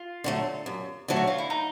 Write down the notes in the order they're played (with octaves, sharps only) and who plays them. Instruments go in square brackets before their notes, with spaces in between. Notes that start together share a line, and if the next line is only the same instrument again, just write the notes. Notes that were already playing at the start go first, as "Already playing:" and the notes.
Already playing: [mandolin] F4
[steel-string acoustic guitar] D3 F#3 A3
F#2
D3 F#3 A3
[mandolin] F#4
F4
E4
D#4